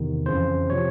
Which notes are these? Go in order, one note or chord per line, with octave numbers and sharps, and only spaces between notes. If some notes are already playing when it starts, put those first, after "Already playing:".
Already playing: E2 C3 D#3
F2 C#3 E3 C5
C3 F3 C#5